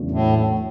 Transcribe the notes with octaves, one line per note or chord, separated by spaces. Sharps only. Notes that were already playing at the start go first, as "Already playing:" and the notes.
Already playing: E2 C#3 F#3 A3 D4
A2